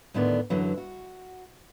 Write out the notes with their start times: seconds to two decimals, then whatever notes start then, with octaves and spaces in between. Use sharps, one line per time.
0.14 D2 A2 D3 D#3 B3 D5
0.50 F#2 D3 E3 F#3
0.78 F#4